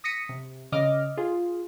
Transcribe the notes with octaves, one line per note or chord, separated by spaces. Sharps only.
D#6 A#6 B6 C#7 D#7
C3
C#3 D#5 D6 F6
F4 G#4